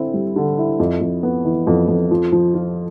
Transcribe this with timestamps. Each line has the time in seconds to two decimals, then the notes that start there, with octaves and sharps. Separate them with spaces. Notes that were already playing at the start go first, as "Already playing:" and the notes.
Already playing: D3 C4 E4
0.14 G3
0.36 D3
0.58 E4
0.80 F2
1.01 F2
1.23 B3
1.45 E3
1.67 F2
1.88 F2
2.11 F3
2.32 F3
2.54 F4